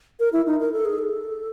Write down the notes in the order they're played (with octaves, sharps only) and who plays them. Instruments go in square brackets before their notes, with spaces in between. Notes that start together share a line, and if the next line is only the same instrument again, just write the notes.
[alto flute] A#4
E4
D#4
A#4
A4
G#4
A4